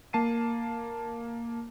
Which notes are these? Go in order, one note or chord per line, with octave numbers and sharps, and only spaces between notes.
A#3 A5 C7 D#7